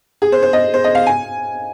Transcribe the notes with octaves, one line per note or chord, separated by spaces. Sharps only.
G#4
C5
C5
D#5
C5
D#5
F5
G#5